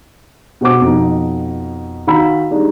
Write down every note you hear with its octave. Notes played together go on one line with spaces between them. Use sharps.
B2 F#4 C5 D6
F2 B2 D#4
D#3 F#4 F5 A#5 B5 E6
G3 G#3 D4 D#4